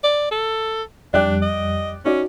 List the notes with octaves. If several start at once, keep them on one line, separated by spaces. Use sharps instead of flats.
D5
A4
F2 G3 D4 D5 G5 F#6
D#5
C#4 D#4 F#4 D5